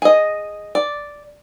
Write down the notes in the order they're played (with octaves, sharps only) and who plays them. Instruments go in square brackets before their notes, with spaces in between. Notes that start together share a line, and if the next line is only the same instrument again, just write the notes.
[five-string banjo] G#4 D#5
D5